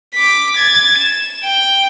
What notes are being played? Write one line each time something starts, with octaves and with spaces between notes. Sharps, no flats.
D6 B6
G#6 A6
E7
G5